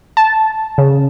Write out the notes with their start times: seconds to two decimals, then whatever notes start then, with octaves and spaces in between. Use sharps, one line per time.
0.17 A5
0.78 C#3